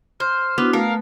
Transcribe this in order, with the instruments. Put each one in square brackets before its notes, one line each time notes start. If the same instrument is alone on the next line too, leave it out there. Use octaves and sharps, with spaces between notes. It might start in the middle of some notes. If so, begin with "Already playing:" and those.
[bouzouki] C5 [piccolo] F6
[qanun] B3 [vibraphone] D4 E4 F#4
[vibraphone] A3 [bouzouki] A#4 [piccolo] F5